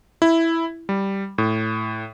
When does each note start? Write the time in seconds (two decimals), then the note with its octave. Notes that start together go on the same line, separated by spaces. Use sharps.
0.22 E4
0.89 G3
1.38 A2